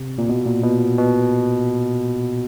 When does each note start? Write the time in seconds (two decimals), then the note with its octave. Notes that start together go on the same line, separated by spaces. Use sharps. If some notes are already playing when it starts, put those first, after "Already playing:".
Already playing: C3
0.18 A#2
0.29 B2
0.45 A#2
0.63 B2
0.98 B2